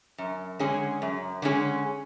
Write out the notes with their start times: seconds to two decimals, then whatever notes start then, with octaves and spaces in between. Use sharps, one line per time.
0.18 F#2
0.59 D3 G#3 C#4 G#4
1.02 F#2
1.42 D3 G#3 C#4 G#4